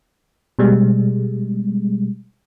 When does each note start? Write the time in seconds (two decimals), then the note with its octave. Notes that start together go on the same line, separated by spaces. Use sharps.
0.59 B2 G3 G#3